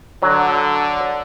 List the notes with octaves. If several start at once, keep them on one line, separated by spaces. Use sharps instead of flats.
D3 F#3